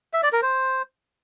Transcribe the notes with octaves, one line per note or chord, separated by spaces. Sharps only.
E5
D5
A#4
C5